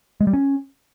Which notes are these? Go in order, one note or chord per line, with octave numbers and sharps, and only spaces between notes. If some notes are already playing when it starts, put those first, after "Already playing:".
G#3
G3
C#4